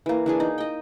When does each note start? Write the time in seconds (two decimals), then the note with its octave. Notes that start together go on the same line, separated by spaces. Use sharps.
0.06 E3 A#3
0.26 E3 D4 G#4
0.40 D#4
0.58 D#5 G5